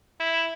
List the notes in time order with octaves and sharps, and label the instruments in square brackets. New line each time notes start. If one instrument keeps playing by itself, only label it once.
[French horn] E4